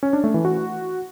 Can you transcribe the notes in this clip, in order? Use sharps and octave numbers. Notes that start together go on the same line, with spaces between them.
C#4
D4
A3
E3
F#4